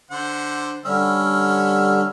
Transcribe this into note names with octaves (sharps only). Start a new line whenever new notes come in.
D3 C5 F#5
D3 G3 C#4 E5 F6